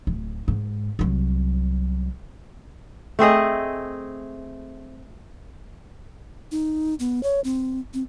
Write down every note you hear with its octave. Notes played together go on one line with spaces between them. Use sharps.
D1
G#2
C2 F#3
A3 C4 G#4 D#5
D#4
B3
C#5
C4
C4